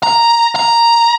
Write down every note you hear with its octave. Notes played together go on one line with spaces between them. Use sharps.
A#5
A#5